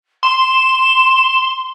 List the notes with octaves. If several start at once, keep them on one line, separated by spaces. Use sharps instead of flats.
C6 E7